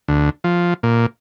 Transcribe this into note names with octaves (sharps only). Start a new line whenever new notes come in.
D2
F3
A#2